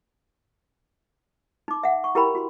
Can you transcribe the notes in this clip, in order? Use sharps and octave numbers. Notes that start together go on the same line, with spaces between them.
D#4 D6
E5 F#5
C#6
E4 G4 A#4 G5 B5
F#4 G4 C6